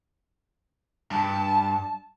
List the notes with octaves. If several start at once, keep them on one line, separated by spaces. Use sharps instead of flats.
G2 A5